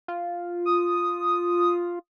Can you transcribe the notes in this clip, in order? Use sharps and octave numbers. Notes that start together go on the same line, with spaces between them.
F4
D#6